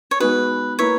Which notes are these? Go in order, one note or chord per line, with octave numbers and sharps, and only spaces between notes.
C#5
G#3 B3 D#4 F#4 B4
A#3 E4 B4 C#5